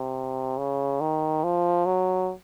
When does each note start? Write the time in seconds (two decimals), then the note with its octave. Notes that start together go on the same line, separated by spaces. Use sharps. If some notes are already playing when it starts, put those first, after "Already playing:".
Already playing: C3
0.58 C#3
1.01 D#3
1.44 F3
1.86 F#3